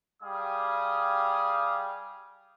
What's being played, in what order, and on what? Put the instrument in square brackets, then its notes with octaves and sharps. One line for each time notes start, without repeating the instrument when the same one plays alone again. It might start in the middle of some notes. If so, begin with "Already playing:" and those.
[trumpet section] G3 G4 G#4 F5 D#6